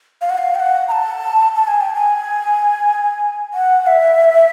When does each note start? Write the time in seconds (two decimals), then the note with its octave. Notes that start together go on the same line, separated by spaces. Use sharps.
0.22 F5
0.30 F#5
0.38 F5
0.55 G5
0.60 F#5
0.88 A#5
0.92 A5
1.55 A5
1.68 G#5
1.81 G5
1.94 G#5
3.54 F#5
3.87 E5